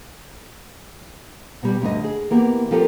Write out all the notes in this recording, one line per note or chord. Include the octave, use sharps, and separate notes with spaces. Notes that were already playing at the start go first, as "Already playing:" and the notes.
B2 G3 D5
D2 G2 D#5
G#4
E3 A#3 B3 G4
F3 C4 F4 G4 A4 A#4